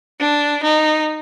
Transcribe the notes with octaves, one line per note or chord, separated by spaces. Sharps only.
D4
D#4